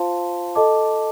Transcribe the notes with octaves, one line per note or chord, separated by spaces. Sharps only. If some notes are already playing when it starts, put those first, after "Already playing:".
Already playing: F4 C5 F5 A5 C6
A4 D#5 A5 D6